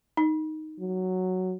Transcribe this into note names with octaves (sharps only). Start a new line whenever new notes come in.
D#4
F#3